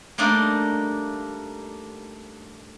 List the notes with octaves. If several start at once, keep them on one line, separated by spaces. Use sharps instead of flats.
G3 A3 A#3 D4 D#4